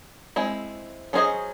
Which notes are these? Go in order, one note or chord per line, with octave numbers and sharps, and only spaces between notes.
G#3 C4 E4
F#3 C#4 G#4 C5 D#5